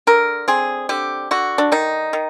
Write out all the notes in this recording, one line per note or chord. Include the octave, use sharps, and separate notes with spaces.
D3 A#4
C4 G#4
D3 G4
D3 F#4
D4
D#3 D#4
D#3